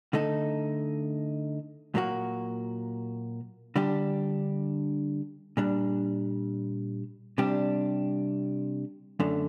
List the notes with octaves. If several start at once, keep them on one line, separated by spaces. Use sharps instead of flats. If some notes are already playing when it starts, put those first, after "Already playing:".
D3 A3 D#4 A4
A#2 F#3 A#3 F#4
D3 G3 D4 G4
A#2 G3 D4
C3 G3 D4 G4
F#2 D3 A3